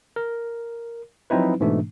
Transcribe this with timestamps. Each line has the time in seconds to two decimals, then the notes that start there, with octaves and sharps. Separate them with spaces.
0.16 A#4
1.30 F3 F#3 C4 D#4 E4 B4
1.60 G#2 B2 E3 A3 D4